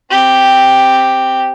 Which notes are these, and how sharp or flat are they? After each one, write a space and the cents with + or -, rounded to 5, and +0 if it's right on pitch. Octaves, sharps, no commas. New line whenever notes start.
C4 +0 G4 +0